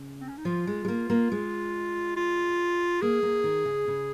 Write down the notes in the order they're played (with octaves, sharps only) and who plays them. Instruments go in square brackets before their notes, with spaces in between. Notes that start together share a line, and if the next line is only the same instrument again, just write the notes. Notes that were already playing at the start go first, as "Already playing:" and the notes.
Already playing: [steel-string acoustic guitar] C#3
[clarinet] C4
C#4
D#4
[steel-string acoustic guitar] F3 [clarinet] F4
[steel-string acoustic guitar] G#3
G#3
A#3
A#3
G#3
[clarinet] F4
[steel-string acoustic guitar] A#3 [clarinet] G#4
[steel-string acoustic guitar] A#3
D#3
C#3
C#3